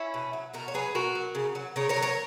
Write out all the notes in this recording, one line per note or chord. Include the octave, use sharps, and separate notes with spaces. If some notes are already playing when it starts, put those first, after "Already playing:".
Already playing: C#4 E4
B2
F#3
B2 F#4 A#4
C#5
F#3 G#4 B4
B2 F#4 A#4
F#3
C#3
F#3
C#3 A#4 C#5
A#4 C#5
F#3
A#4 C#5